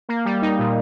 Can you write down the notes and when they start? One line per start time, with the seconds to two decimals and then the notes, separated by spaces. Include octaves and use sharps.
0.09 A#3
0.25 G3
0.42 D#4
0.59 A#2